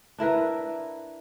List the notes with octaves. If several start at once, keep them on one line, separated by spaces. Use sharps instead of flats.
D4 E4 A#4 B4